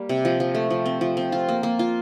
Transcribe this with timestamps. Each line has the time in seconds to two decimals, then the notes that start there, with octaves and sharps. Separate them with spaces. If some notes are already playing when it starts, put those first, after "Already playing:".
Already playing: G3 A#3
0.09 C3
0.25 F3
0.40 F3
0.55 A3
0.70 F3
0.86 C4
1.01 F3
1.17 C4
1.32 F4
1.49 A#3
1.63 A#3
1.79 F4